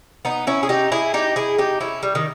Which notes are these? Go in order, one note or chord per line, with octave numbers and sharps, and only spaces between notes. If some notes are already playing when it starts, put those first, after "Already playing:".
B3 D#4
C#4 E4
G#4
D#4 G4
E4 G#4
D#4 G4
E4 G#4
D#4 G4
C#4 E4
G3
D#3